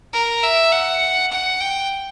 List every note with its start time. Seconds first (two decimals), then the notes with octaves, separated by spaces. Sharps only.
0.13 A#4
0.43 E5
0.72 F#5
1.31 F#5
1.60 G5